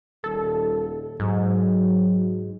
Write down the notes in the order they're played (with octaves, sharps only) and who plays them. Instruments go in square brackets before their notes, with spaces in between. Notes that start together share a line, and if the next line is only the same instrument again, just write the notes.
[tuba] D#1 [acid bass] A4
[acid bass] G#2 [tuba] F#3